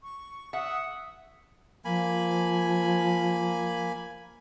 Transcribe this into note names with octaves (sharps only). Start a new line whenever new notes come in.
C#6
E5 F#5 D#6
F3 A#3 G#5 B5